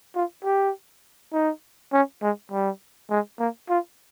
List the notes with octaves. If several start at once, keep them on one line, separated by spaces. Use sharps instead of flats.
F4
G4
D#4
C#4
G#3
G3
G#3
A#3
F4